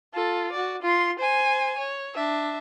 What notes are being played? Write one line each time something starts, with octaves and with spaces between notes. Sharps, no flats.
F4 A4
F#4 D5
F4 C6
C5 G#5
C#5
D4 E5